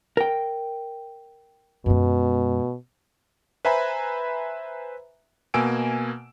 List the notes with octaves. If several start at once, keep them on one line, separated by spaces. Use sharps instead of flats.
A#4 G5
F#2 B2 G#3
B4 C5 E5 G#5 A#5 B5
B2 A#3 G#5 E6 D7